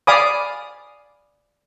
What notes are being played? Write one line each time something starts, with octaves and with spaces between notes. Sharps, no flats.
D5 F5 G#5 B5 D6 D#6